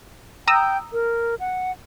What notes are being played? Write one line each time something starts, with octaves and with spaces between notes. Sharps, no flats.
G5 A#5 D#6 E6
A#4
F#5